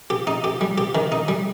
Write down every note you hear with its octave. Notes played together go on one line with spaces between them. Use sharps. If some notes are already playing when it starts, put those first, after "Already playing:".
G4
D#4
G4
G3
G4
D#3
D#4
G3